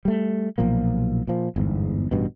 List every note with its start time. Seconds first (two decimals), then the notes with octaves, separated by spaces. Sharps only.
0.05 G3 A3
0.58 B1 A#2 F3 A#3
1.27 A#2 F3
1.56 G1 E2 G#2
2.11 A1 G2 B2